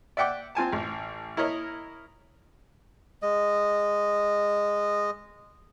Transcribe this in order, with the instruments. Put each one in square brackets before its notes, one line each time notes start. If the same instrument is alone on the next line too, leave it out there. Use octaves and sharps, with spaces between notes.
[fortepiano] D5 E5 F#5 G5 D6
C4 F4 G#5 A5
A1
E4 A#4 C#5 D#5
[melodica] G#3 D#5